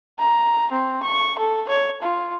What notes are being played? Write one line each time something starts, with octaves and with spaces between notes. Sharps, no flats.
A#5
C4
C#6
A4
C#5
F4